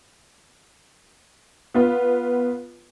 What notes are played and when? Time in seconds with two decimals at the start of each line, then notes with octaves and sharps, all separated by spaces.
1.74 B3 F4